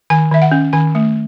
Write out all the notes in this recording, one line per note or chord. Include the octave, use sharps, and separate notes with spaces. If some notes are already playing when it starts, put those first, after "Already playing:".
D#3 G#5
D#3 E5
F#5
C#4
D#3 G#5
A3